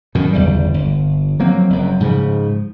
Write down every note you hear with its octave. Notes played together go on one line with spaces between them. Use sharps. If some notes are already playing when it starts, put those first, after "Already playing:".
F#2 B2 D#3
G1 E2 C#3 G3
G1
F3 F#3 A#3 C4
F#1 F#2
G#2 C#3 F3